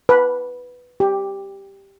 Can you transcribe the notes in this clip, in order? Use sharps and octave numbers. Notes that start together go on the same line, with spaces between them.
B4
G4